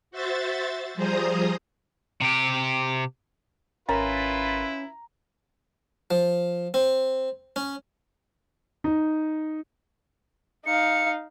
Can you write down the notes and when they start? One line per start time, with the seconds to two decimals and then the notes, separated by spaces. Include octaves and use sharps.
0.11 F#4 C5 E5 A6
0.94 F3 G3 G#4 C5 A#5 D#6
2.22 C3 G4
3.89 G#1 C#4 E4 F4 A#4 B4 A#5 A6
6.11 F3
6.74 C4
7.56 C#4
8.84 D#4
10.66 D#4 F5 C#7